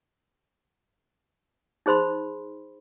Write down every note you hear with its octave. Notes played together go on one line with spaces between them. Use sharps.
D#4 G#4 C5 B5 C6